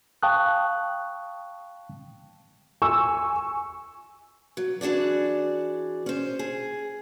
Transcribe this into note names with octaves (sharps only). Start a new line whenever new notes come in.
F5 G5 A5 C#6 D#6 F#6
G#5 C#6 E6
F#3
E3 D4 F#4 G#4 D5
C#4 C5
G#4